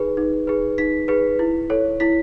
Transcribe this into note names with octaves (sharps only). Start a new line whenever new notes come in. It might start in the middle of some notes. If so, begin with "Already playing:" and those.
Already playing: D#4 G#4 B4
D#4
G#4 B4
D#4 B6
G#4 B4
E4
A4 C#5
E4 B6